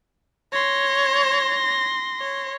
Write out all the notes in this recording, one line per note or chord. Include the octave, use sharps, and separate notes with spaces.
C#5 C6 A#6
C#5